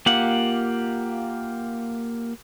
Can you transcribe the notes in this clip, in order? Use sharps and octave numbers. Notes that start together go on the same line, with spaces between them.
A#3 F4 G4 F#5